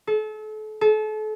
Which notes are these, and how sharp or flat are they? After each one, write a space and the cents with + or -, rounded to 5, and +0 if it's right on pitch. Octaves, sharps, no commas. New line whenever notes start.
A4 -35
A4 -35